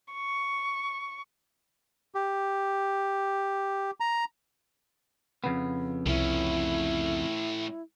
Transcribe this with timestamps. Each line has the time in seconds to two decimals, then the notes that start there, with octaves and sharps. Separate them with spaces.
0.12 C#6
2.15 G4
4.00 A#5
5.44 F2 C#3 B3
6.06 C2 A2 C#4 E4